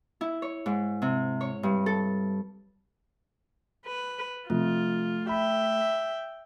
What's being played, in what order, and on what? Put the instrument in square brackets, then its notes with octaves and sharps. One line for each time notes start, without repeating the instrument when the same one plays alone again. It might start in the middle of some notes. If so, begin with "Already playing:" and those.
[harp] E4
C#5
G#2
C3
C#5
G2
A4
[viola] B4
[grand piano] C3 F3 [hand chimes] A3 [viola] F4
[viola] E5 G5 [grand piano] B5